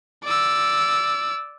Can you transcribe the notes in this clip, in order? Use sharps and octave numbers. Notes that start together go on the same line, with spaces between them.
D5 E6